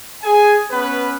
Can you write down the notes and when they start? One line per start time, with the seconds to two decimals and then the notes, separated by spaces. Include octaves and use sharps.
0.24 G#4 G#5
0.71 B3 C#4 B4